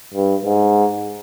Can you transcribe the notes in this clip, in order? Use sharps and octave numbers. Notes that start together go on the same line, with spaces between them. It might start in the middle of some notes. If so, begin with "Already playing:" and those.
G2
G#2